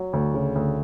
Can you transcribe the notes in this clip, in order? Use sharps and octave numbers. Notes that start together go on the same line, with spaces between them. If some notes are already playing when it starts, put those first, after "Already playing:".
Already playing: F#3
D2
C#3
D2